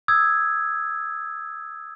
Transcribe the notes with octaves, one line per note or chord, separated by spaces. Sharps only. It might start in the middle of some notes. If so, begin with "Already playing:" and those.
D#6 E6 G#6